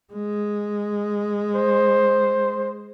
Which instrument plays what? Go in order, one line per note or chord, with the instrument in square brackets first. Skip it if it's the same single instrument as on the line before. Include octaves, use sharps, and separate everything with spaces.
[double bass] G#3
[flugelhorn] C5